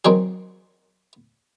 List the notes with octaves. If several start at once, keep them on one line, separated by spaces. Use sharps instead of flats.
D#3 F#3 C4 G#4